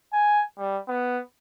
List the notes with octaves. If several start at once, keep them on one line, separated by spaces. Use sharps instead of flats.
G#5
G3
B3